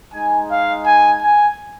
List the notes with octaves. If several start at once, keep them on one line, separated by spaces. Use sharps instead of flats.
G#3 D#4 G#5
F5
G#5
G#5